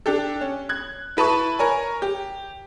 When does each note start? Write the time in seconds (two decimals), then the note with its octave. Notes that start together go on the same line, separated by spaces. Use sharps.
0.06 D4 G4 A4
0.41 C#4
0.69 F#6 G#6
1.17 E4 B4 A5 C#6
1.59 A#4 C#5 G#5
2.02 G4